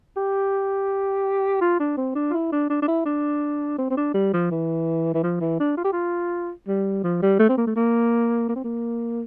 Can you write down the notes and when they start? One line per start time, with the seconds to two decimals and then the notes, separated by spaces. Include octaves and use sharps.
0.17 G4
1.61 F4
1.80 D4
1.97 C4
2.15 D4
2.30 F4
2.34 E4
2.52 D4
2.70 D4
2.82 D4
2.88 E4
3.06 D4
3.78 C4
3.90 C4
3.97 D4
4.14 G3
4.33 F3
4.51 E3
5.14 E3
5.23 F3
5.40 E3
5.60 D4
5.77 F4
5.84 G4
5.92 F4
6.68 G3
7.04 F3
7.22 G3
7.39 A3
7.49 C4
7.58 A#3
7.67 A3
7.76 A#3
8.49 A#3
8.56 C4
8.64 A#3